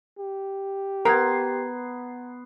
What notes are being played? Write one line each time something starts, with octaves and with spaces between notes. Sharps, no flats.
G4
B3 A#4 A#5 C6 G#6